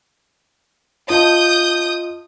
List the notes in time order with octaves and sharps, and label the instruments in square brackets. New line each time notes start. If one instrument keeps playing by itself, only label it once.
[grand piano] F4 D#5 A5 [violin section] D#6 G6